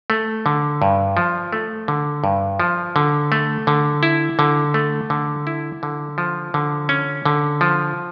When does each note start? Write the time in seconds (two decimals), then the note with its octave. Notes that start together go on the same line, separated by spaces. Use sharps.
0.10 A3
0.46 D3
0.82 G2
1.17 F3
1.53 A3
1.88 D3
2.24 G2
2.60 F3
2.96 D3
3.32 A3
3.67 D3
4.03 E4
4.39 D3
4.74 A3
5.10 D3
5.47 E4
5.83 D3
6.18 F3
6.54 D3
6.89 C#4
7.26 D3
7.61 F3